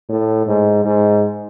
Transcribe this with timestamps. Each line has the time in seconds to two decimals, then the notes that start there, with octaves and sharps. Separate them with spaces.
0.09 A2
0.47 G#2
0.85 G#2